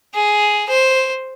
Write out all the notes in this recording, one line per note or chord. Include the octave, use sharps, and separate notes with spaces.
G#4
C5